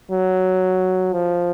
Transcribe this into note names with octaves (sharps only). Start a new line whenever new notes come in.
F#3
F3